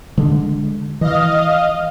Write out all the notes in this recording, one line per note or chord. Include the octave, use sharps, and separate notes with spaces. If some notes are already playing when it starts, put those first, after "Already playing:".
D3 G#3
E3 D#5 F5